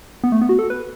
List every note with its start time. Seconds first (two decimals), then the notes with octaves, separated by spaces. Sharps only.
0.24 B3
0.32 A3
0.41 B3
0.49 F#4
0.59 A4
0.70 B4